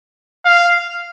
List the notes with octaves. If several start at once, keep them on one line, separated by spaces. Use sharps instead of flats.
F5